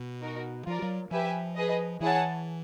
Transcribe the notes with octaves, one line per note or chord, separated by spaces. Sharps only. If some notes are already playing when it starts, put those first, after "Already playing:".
Already playing: B2
D#4 F#4 A#4
F3 F4 A#4 D5
F#3
F3 G4 B4 E5 G#5
G#4 B4 D#5
E3 E4 G#4 C#5 F#5 A5